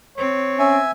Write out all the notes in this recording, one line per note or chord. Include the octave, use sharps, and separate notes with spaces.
C4 C#5
C#4 E5 G#5